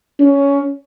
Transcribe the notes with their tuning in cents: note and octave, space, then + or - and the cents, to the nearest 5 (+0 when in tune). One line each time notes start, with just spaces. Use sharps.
C#4 +15